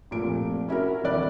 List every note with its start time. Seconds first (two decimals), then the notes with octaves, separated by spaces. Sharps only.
0.11 F1 A#2 D7
0.69 C#4 E4 F#4 A#4
1.04 D#1 C3 E4 D5 F#6